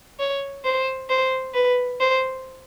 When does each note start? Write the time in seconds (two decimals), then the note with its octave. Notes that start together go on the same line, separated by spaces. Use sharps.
0.19 C#5
0.64 C5
1.10 C5
1.54 B4
2.00 C5